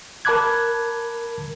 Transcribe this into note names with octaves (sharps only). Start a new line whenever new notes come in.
A#4 A5 B5 D6 F#6 G#6